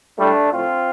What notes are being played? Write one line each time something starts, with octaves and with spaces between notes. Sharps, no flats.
A2 G3 A3 D4
A2 F3 C4 F4